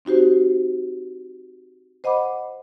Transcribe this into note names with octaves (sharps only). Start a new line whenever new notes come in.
C4 D#4 F#4 G4 C5
C5 D#5 F#5 B5 D6